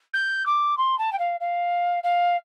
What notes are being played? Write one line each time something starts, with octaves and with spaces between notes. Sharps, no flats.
G6
D6
C6
A5
G5
F5
F5
F5